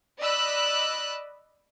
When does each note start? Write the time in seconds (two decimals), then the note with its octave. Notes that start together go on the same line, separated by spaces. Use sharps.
0.19 D5 D#5 B5 E6 F#6